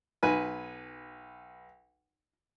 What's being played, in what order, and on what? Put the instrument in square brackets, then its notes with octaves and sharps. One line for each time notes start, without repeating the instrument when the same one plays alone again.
[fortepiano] B1 B4 G#5